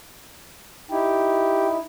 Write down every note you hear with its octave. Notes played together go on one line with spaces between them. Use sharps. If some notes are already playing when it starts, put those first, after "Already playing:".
D#4 E4 G4